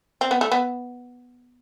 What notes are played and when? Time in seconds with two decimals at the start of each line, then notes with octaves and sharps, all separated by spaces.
0.21 C4
0.31 B3
0.41 A3
0.51 B3